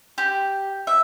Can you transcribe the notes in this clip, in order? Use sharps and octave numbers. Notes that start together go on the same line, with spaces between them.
G4
E5